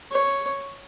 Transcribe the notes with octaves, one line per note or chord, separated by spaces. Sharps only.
C#5